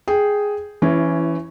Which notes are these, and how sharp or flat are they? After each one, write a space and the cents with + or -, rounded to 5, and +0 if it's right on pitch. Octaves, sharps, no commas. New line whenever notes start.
G#4 +0 G5 +0
E3 +20 C#4 +0 E4 +0